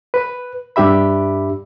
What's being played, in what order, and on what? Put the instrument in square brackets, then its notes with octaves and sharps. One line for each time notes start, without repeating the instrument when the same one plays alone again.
[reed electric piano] B4
G2 D4 G4 E5 B5